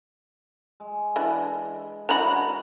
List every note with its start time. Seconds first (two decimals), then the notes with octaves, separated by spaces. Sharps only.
0.80 G#3
1.16 E3 D4 E4
2.09 E3 D4 F#4 A#5 B5